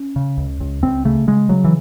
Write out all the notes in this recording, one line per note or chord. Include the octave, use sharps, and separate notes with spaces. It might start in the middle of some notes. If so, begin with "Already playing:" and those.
Already playing: C#4
C#3
C#2
C#2
C#2 C4
C#3 A3
C#3 G#3
C#3 F#3
E3